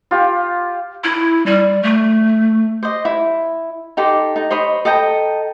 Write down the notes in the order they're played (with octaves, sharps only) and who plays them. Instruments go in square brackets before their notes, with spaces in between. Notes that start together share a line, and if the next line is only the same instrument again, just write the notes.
[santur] F4 G4
[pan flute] E4
G3
A3
[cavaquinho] C5 D#5
E4
D#4 G4 A4 C6
D#4
C5 C#5 D#5 B5
A4 D#5 G5 A#5